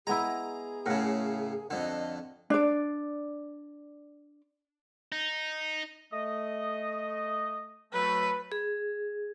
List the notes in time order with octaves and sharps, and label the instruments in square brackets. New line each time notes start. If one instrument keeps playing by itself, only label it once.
[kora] G#3 B3 E4 [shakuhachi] G#4 [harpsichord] A#5
[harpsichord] A2 C#3 [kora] A#4 F#5
[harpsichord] F2 D3 [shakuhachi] D#5
[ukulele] D4 D5
[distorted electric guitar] D#4
[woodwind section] A3 D#5
[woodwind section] F#3 A3 [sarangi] B4
[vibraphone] G#4